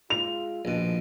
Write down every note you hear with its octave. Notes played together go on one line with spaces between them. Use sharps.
G#3 F4 F7
A#1 G#2 B2 D#3 F3